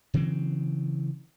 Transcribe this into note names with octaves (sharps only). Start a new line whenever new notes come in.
C#3 E3 F#3 C4